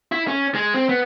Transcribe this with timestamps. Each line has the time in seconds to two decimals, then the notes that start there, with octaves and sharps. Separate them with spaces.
0.12 E4
0.28 C#4
0.55 G#3
0.74 C4
0.89 B3